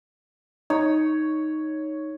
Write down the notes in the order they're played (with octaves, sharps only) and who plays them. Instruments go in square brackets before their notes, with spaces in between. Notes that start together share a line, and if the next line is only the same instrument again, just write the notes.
[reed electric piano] D#4 [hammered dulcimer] C#5